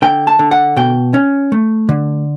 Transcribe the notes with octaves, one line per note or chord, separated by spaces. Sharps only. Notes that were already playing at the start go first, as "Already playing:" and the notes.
D3 G5
A5
D3
F#5
B2 G5
C#4
A3
D3